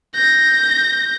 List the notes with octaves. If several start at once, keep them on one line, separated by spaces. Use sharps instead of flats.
G6 A#6